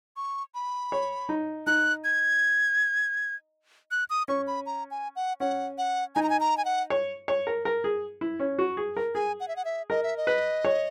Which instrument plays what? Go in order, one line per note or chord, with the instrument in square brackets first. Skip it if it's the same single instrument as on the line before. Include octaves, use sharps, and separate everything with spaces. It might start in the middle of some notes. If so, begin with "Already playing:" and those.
[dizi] C#6
B5
[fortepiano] C#5
D#4
[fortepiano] D#4 [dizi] F#6
[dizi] G#6
F#6
D#6
[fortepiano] C#4 [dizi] C#6
[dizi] B5
A#5
G#5
F#5
[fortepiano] C#4 [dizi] F#5
[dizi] F#5
[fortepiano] D#4 [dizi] G#5
[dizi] A#5
G#5
A#5
G#5
F#5
[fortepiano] C#5
C#5
A#4
A#4
G#4
E4
C#4
F#4
G#4
A#4
[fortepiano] G#4 [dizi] G#5
[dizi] F#5
E5
F#5
E5
[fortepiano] A#4 [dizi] D#5
[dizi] E5
D#5
[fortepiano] B4
C#5